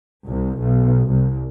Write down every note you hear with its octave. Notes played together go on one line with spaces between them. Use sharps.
C2
B1
C2